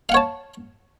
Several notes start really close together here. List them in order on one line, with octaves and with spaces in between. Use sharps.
F5 F#5 C#5 A5